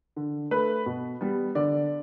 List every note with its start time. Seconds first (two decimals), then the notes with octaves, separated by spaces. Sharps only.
0.16 D3
0.51 A3 B4
0.86 B2
1.21 G3 B3
1.55 D3 D5